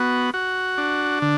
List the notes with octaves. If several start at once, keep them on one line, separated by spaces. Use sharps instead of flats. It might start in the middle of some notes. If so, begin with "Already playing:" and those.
Already playing: B3 F#4
F#4
D4
D3